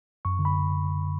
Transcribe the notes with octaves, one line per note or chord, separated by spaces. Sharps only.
F#2 C#6
D3
B5